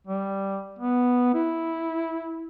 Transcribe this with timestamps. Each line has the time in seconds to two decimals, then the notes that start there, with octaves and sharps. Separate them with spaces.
0.07 G3
0.79 B3
1.34 E4